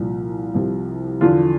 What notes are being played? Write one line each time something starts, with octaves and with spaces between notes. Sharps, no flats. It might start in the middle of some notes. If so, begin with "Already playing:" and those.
Already playing: C2 A#2 F3
C2 C3 F3
E2 D3 F3 F4